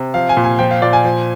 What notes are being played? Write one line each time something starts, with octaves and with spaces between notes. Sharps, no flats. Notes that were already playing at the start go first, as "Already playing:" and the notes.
Already playing: C3
F3 F5
G#5
A#2
G#5
F3 G5
F5
A#2 D5
G#5
F3